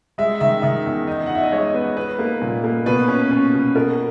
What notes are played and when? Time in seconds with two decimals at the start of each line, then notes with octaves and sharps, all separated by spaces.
0.18 G#3 E5
0.40 D#3 E5
0.62 D#3 E5
0.86 E2
1.07 D#4
1.26 D#4 F#5
1.35 E5
1.43 D#5
1.51 G#3 C#5
1.74 B3 B4
1.97 D#4 B4
2.19 A#3
2.42 A#2
2.64 A#3
2.86 B2 B4
3.08 C#4
3.31 C#4
3.53 B2
3.75 B2 A#4